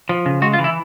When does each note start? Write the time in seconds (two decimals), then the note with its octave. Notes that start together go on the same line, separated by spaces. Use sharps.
0.09 F3
0.26 C#3
0.42 G#3 F#4
0.53 F4
0.59 E3
0.64 E4